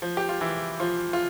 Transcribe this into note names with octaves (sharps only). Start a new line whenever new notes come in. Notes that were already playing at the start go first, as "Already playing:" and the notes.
F3
G4
F4
E3 E4
F3 F4
F4